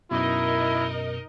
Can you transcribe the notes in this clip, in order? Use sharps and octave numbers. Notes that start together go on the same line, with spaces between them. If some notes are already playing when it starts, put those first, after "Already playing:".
F#2 B2 D#4 E4 A#4 D#5